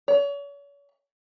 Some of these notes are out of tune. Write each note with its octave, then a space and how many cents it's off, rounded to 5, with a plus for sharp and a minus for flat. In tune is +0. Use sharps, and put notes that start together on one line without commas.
C#5 +40